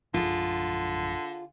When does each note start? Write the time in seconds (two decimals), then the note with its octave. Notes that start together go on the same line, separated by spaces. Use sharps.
0.14 A#1 F#2 D3 F3 F4 G#4